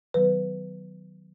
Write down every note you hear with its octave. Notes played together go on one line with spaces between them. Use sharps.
D#3 F#3 B3 B4